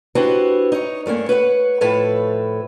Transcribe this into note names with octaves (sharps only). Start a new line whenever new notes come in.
D4 E4 F#4 G4 B4 C5
D#4 C#5
G2 A3 A#3 C#4
B4 C#5 D#5 F#5
A2 F3 A4 B4 C#5 E5